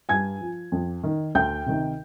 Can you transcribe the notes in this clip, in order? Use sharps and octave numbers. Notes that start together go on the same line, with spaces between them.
G2 G#5 G#6
F3
F2
D#3
D2 G5 G6
C3 D#3